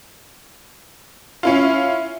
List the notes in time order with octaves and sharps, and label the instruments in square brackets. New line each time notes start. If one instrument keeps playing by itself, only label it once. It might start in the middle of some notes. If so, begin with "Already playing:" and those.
[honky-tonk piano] C#4 E4 F4